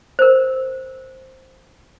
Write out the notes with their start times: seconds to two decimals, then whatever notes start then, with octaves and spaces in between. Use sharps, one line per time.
0.19 A#4 C5